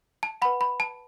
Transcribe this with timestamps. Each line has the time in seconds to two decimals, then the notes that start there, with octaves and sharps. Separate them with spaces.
0.23 A5
0.42 B4 F#5 B5
0.61 B5
0.80 A5